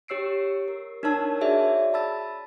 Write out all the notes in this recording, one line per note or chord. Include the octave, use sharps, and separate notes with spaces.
G4 C#5 E6 C7 D7
A#4
D4 D#4 A#4 C#5 A5 E6
F#4 G#4 C#5 D5 E5
A5 B5 E6 A6